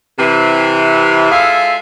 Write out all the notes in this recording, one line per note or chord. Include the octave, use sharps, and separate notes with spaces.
C3 E3
G#3 F4 G#4 A4 E5 F5